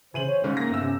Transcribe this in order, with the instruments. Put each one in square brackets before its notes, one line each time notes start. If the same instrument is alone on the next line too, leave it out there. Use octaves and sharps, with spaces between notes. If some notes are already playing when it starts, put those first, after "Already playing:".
[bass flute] C#3 [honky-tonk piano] E3 D#7 F#7 [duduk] C5
[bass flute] C#5
[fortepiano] G#2 C#3 C#4 [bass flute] G#3
[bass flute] A#3 [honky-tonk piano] A#6
[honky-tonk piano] G1 E6
[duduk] C3 [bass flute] C#4